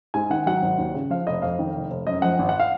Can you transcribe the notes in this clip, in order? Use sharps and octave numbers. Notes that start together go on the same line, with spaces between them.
G#2 G#5
D#3 F#5
F#3 F#5
G#1
D#2
C#3
F3 F5
F1 D#5
F2 F5
D#3
F1
F1
F#2 D#5
F3 F#5
G#1
F#5
F5